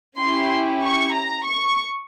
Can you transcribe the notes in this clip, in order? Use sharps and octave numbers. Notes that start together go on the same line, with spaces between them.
C#4 E4 G4 C6
C#6
A#5
C#6